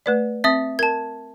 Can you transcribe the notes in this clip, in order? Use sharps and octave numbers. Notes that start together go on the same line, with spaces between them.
A3 B4 D5
C4 E5 D#6 A6
A#4 A5 G#6